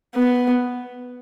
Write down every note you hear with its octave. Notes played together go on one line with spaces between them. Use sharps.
B3